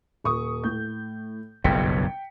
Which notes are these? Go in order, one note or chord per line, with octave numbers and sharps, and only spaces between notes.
D#1 C#6 D#6
A2 G6
F#1 B1 G2 G5 B6 C#7